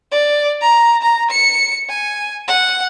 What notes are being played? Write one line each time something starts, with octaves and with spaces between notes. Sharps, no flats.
D5
A#5
A#5
C#7
G#5
F#5